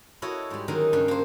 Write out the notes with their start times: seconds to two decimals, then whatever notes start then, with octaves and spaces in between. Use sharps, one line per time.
0.22 E4 F#4 A4 C#5 D#5
0.50 G#2 G3
0.68 D3 D#3 F#3 D#4 G#4
0.93 G2 C#3 D4
1.08 A#3 C5